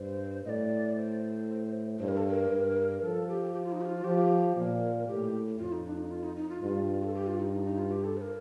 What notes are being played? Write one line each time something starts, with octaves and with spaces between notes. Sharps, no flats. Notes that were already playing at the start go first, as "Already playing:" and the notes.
Already playing: G2 C5
A2 D5 D#5
C5
G2 C5
A#4
A4
A#4
G2
F3 A4
G4
G4
F4
D#4
G4
F4
F3 G4
A#2 A#4
A2 G4
F2 F4
D#4
D4
D#4
F4
D#4
D#4
F4
G2 F4
A4
G4
F4
D#4
D#4
D#4
F4
G4
A4
C5
A#4